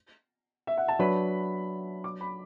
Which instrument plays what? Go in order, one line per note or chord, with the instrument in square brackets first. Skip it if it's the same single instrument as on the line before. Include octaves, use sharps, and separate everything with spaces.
[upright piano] E5
F#5
A5
[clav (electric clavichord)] F#3 D4 B4 [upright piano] B5
[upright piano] D6
B5